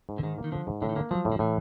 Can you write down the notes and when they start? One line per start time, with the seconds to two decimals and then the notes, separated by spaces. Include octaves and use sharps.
0.09 G#2
0.18 D3
0.23 G#2 D#3
0.38 A#3
0.44 D#3
0.52 D3 F3
0.67 G#2
0.82 A2 D3
0.89 D#3
0.96 D3 A#3
1.11 F3 F#3
1.25 A2
1.32 F3
1.39 A2 E3